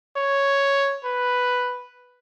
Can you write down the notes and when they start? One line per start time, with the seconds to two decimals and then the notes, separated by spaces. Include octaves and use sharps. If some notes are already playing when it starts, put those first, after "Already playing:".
0.16 C#5
1.05 B4